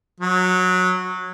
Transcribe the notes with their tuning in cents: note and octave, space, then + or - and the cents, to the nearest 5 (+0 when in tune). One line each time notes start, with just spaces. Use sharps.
F#3 -15